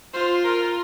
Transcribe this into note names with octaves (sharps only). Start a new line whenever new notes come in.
F4 C5
A#4